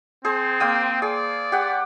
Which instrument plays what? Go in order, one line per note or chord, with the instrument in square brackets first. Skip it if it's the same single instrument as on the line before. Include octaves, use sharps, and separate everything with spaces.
[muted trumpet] C4 [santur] G#4 C5
[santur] A#3 G5 D#6
[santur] G#4 [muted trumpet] D5
[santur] G4 F#5